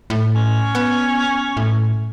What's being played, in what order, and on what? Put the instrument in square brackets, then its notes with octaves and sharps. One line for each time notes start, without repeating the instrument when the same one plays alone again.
[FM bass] A2
[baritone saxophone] C#4
[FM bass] B3
A2